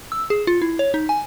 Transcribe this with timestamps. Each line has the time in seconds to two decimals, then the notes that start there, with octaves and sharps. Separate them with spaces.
0.12 E6
0.30 G#4
0.47 F4
0.62 E4
0.79 C#5
0.94 D#4
1.09 G#5